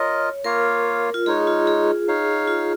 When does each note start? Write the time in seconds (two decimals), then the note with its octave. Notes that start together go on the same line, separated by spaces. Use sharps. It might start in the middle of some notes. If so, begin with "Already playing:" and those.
Already playing: F4 A#4 C#5 D#5
0.44 A#3 F4 A#4 C#5 F5
1.14 F4
1.26 G#3 D#4 G#4 C#5
1.47 F4
1.67 G#4
2.08 D#4 C#5 F5
2.47 F4